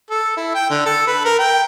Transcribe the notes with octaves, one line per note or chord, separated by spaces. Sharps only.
A4
E4
G5
D3
A4
B4
A#4
G5